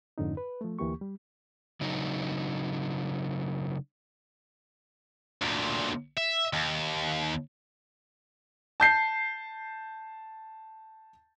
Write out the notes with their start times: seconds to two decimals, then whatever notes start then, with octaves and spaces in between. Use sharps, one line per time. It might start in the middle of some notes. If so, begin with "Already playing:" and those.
0.18 F2 G#2 D3 C#4 D#4
0.37 B4
0.61 F3 A3
0.79 D2 E3 A#3 G4 C#6
1.01 G3
1.81 C#3 F#3 D4 D#4
5.41 D2 A#2
6.18 E5
6.53 D#2
8.80 A5 G6 C7